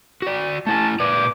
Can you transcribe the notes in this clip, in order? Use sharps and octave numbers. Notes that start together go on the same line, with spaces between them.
F#4 D5
A3 E4 G#5 A5
A#2 B4 D5 D6